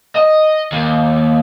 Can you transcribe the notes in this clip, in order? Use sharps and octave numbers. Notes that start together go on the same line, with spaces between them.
D#5
D#2